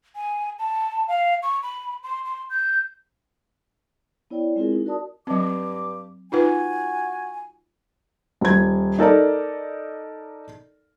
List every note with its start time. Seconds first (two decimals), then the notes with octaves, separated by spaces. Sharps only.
0.16 G#5
0.59 A5
1.08 F5
1.43 C#6
1.63 B5
2.03 C6
2.25 C6
2.50 G6
4.30 B3 E4 C#5 D5 G5
4.56 G#3 C4 E4 F4 G#4 A#4
4.72 D#4
4.85 F#4 A#4 D5 A5 D#6
5.27 G2 F#3 C4 D6
6.32 D#4 F4 F#4 B4 G#5
8.41 D#1 G#6
8.99 D#4 A4 A#4 D5